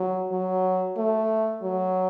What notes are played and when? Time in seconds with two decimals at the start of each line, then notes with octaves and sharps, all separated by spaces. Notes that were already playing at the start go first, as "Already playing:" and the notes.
Already playing: F#3
0.32 F#3
0.97 A3
1.62 F#3